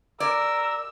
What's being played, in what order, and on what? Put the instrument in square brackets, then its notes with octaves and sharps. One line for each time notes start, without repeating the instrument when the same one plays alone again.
[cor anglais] A#4 [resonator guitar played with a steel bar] D5 [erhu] E6